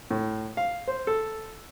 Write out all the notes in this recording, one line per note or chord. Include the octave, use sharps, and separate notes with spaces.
A2
F5
C5
A4